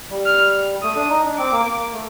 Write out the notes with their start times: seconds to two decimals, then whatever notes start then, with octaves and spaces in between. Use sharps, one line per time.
0.10 G3
0.26 F6
0.83 A3 D#6
0.96 D4
1.10 D#4
1.25 D4
1.38 C4 D6
1.52 A#3
1.66 A#3
1.80 A#3
1.94 A3